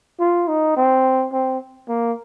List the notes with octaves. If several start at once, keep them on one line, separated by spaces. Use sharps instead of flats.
F4
D#4
C4
C4
A#3